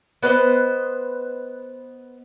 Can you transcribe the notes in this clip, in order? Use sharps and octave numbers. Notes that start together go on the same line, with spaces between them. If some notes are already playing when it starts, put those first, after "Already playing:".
B3 B4 C5 D#5